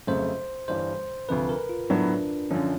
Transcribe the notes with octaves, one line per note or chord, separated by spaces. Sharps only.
F1 F2 C#3 F#3 A3 C5
G1 G2 E3 G3 C5
D2 C3 F3 B4
A#4
F4
A2 F#3 B3 D4
F#2 D3 F3 C#4